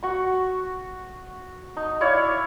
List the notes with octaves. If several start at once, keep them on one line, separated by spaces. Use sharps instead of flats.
F#4 C#6
D#4
E4 C#5 D5 F5